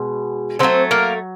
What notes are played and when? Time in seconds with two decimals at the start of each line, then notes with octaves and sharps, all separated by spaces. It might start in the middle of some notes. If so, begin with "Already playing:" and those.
Already playing: B2 G#3
0.59 D3 F#3 A3 C4 C5
0.91 A#3 A#4